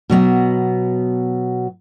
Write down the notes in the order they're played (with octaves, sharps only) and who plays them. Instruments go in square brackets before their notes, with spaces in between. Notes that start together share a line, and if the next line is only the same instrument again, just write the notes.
[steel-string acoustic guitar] B2 F#3 B3